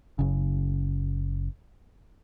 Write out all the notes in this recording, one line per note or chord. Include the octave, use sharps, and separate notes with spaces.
F#1 C#3